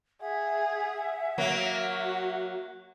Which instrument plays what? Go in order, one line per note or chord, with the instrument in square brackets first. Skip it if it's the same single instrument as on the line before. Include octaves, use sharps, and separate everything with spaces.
[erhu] G#4 [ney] E5 [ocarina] F#5
[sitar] F#3 A#3 [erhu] F#4